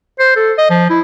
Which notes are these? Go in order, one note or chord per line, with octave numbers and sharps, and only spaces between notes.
C5
A4
D#5
F3
E4